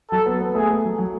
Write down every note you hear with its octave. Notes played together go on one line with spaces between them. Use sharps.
F#3 A4
B3
B3
A3 G#4
A3
F#3
F#3